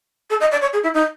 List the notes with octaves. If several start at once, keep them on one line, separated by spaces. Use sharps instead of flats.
A4
D#5
D5
C#5
G#4
E4
D#4